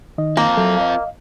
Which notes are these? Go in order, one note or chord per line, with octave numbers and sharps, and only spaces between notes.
D#3 D#4 D#5
A#3 C4 F4
F#3 A4 E5
D#5 F5